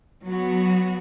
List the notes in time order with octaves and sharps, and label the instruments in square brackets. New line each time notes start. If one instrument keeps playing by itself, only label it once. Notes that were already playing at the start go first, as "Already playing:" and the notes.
[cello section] F#3 B3 F#4